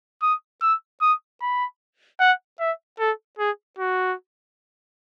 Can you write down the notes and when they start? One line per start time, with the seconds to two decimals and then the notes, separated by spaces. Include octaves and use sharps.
0.22 D#6
0.62 E6
1.01 D#6
1.41 B5
2.20 F#5
2.60 E5
2.99 A4
3.39 G#4
3.79 F#4